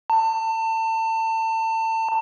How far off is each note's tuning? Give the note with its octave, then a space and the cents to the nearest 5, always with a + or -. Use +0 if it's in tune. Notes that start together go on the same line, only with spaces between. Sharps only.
A5 +30